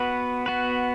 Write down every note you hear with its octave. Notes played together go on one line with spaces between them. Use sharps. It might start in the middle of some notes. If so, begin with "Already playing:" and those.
Already playing: B3 F#4 B4
B3 F#4 B4